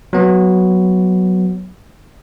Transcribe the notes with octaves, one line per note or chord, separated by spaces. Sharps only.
F#3 B3